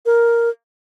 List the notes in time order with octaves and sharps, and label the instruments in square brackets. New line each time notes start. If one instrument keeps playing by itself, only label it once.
[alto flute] A#4